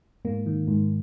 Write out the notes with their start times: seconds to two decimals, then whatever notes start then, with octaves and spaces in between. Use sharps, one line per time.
0.25 G#2 A#3
0.46 D#3
0.68 G#2